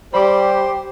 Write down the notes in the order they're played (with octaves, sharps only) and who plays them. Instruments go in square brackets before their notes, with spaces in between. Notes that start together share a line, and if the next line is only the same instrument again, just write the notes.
[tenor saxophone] G3 [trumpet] G4 [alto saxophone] C5 [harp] B5 D6